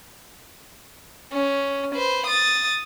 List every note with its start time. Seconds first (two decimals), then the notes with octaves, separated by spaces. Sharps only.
1.32 C#4
1.95 B4 C5
2.26 D#6 A6